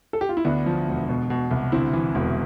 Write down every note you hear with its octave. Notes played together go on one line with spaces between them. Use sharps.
A4
G4
F4
E4
D2 B3 D4
F3
E1
B2
B2
C2
D2 C4 E4
E3
E1